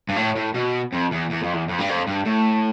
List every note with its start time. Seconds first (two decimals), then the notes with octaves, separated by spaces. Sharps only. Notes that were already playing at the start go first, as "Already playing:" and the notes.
0.09 G2
0.16 A2
0.36 A2
0.55 B2
0.93 F2
1.11 E2
1.30 E2
1.43 F2
1.53 E2
1.68 F2
1.79 G2
1.89 F2
2.07 G2
2.25 A2